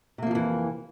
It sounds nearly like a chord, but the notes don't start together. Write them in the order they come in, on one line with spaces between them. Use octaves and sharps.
C3 A#3 F3 F2 E3